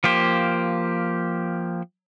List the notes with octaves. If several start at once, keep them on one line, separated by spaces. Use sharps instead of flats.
F3 A#3 G4 C5